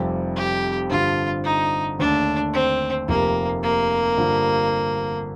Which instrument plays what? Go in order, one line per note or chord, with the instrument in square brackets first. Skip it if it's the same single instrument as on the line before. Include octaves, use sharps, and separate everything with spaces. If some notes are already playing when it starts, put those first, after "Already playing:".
Already playing: [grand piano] F1 F2 C3 G3
[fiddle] G4
[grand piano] G2 D3 F3 [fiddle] F4
[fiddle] D#4
[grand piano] D#2 D3 A3 [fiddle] D4
[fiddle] C4
[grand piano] F1 F2 C3 [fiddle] A#3
[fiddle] A#3
[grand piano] G2 D3 F3